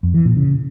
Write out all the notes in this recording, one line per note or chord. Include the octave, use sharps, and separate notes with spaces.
F2
E3
A#2
C#3